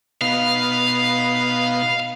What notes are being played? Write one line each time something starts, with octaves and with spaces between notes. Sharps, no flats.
B2 B3 D#4 F5